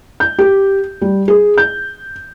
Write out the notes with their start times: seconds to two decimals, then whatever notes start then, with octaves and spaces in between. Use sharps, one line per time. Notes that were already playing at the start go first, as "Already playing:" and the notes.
0.20 G6
0.39 G4
1.02 G3
1.28 G#4
1.58 G6